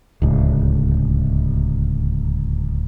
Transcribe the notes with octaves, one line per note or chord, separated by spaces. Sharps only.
D1 C#2